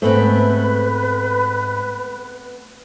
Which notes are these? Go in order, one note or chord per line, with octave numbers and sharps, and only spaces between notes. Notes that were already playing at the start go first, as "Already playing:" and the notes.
G#2 A3 B3 C4 B4